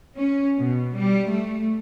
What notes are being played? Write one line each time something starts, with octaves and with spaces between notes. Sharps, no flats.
C#4
B2
G3
A3